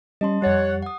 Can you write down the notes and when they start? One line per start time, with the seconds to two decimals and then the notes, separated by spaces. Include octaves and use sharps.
0.21 G3 C#4 D#5 A5 C6
0.42 F2 G3 G4 C#5 F#5 A6
0.82 F#5 D#6